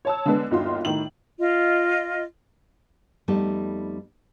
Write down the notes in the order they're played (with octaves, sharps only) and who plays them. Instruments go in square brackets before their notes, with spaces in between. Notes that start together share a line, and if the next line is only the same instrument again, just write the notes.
[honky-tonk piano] C#5 A5 E6
D3 G#3 B3 D4
G1 D#2 D#4 F4 F#4 C6
A2 D#3 F#7
[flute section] F4 D#5
[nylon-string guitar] F2 G3 A3 B3 D#4 A5